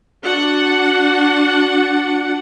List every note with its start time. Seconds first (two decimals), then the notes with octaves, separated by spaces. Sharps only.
0.24 D4 F#4 F#5